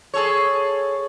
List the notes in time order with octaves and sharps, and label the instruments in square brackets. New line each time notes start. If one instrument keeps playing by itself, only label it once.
[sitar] G#4 A4 C#5